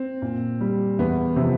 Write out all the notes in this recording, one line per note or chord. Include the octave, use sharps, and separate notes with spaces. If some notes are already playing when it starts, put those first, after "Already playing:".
Already playing: C4
A#2
G3
E2 B3
C3 F3